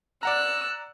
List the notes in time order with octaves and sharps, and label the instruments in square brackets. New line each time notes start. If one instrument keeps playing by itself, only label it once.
[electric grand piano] D5 F#5 A#5 [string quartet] E6 F#6